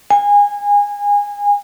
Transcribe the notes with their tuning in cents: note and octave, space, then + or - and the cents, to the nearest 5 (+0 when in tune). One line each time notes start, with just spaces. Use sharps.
G#5 -25